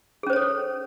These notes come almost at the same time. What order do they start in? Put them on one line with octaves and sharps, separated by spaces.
G#4 C#4 C5 C#5 A4